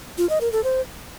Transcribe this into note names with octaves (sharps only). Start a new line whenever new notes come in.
F4
D#5
A#4
A4
C5